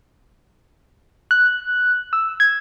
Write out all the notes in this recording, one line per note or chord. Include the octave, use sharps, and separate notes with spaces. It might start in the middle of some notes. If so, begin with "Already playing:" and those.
F#6
E6
G#6